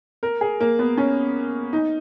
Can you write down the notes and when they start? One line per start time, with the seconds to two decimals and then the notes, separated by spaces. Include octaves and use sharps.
0.23 A#4
0.41 G#4
0.60 A#3
0.79 B3
0.97 C#4
1.73 D#4